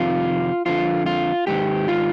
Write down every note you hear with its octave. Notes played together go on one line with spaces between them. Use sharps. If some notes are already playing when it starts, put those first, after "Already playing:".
Already playing: F2 C3 D#3 F4
F2 D3 F4
F4
G#2 D#3 G4
F4